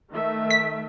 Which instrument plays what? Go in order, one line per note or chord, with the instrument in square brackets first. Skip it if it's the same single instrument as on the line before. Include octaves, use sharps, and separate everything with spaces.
[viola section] D#3 A3 E5
[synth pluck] B6